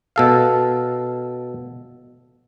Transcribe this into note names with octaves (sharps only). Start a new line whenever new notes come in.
B2 A4 F5